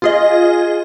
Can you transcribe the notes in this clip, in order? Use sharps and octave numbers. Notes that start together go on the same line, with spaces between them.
F4 G#4 D#5